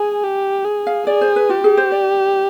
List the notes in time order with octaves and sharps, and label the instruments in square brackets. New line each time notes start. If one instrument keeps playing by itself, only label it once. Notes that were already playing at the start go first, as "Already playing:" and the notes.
Already playing: [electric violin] G#4 [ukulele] G#5
[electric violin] G4
G#4
[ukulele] F5
[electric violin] G#4 [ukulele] D5
[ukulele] C5
B4
[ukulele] F4 [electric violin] G4
[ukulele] G#4
C5
D5